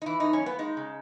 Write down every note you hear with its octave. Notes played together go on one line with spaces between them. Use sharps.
D#4
E3 E4
F#2 D#4
C#4
A#3 B3
G#3 D#4
C#3